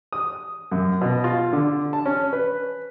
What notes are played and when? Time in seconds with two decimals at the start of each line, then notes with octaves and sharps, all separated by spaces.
0.13 D#6
0.72 F#2
1.01 B2
1.24 F4
1.53 D3
1.93 A5
2.06 C#4
2.33 B4